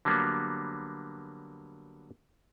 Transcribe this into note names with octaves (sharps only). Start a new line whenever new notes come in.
D3 F#3 G3 A#3 B3